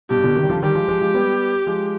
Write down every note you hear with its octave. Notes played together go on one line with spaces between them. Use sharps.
G2 B2 G4
B2 D3
C3 D#3
G3
D3 F3
D#3 G3 G4
F3 G#3
F3 G#3
F3 G#3
G3 B3
F3 G#3